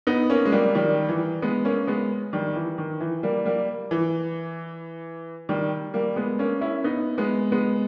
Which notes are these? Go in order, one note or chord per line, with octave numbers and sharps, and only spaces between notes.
B3 D#4
A#3 C#4
G#3
G3 A#3
D#3 G3
E3
G#3 B3
A#3 C#4
G#3 B3
D#3 G3
E3
D#3
E3
G3 A#3
G3 A#3
E3
D#3 G3
G3 A#3
G#3 B3
A#3 C#4
C#4 E4
B3 D#4
G#3 B3
G#3 B3